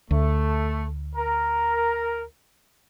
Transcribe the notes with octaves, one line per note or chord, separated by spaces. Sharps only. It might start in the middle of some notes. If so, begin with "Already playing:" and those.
D2 A3
A#4